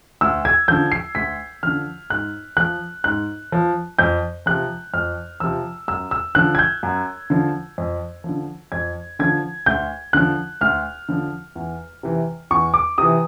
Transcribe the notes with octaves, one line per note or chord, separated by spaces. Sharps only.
D2 E6
G#6
D3 F3 G6
C7
D2 B6
D3 F3 F6
G#2 F#6
F3 F#6
G#2 F#6
F3
F2 G6
C3 F3 F#6
F2 F6
C3 F3 E6
F#2 E6
E6
D3 F3 F#6
G#6
G6
F#2
D3 F3
F2
D3 F3
F2 G#6
D3 F3 G#6
D2 G6
D3 F3 F#6
D2 F6
D3 F3
E2
C3 E3
E2 C#6
D6
C3 E3 D#6